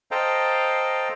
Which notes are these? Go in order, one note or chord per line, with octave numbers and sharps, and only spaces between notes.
A4 C5 D#5 F5 G5 A#5